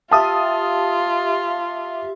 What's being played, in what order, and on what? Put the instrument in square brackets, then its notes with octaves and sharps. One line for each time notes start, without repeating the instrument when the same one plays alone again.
[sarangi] F4 [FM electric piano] G4 E5 F5 [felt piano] A5 D#6